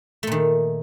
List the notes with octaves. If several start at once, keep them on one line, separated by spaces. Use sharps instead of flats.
A#2 D#3 A3